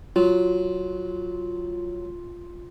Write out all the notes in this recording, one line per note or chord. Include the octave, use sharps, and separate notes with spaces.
F#3 F4